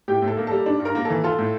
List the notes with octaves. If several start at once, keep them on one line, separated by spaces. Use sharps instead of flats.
A2 G4 G5
A2
A4 A5
A#3
G3 A4 A5
D4
G2
A#4 A#5
A#3
E3 A4 A5
F4 A4 A5
A2